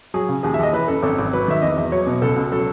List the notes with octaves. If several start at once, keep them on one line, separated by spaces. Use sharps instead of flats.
F#3 G#4
C#3
D#2 G#4
E5
D#2 D#5
E3 B4
F#2 A4
G#1 A4
G#1
F#3 B4
D#3 E5
E2 D#5
E2
F#3 C#5
B2
C#2 A4
C#2
F#3 A4